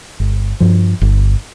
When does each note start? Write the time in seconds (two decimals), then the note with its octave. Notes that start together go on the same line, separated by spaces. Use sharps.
0.20 G1
0.60 G2 F3
1.02 G1